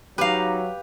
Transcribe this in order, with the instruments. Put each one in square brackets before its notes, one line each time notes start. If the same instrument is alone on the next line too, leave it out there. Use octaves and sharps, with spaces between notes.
[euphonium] F#3 [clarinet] D#4 [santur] G4 [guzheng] B4 F5